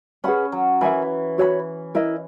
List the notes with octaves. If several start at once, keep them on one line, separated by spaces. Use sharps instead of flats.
C#4 G#4 B4 F#5 B5
F#3
E3 A#4 E5 G#5 B5
F#4 C#5 G#5 B5
E4 A#4 D#5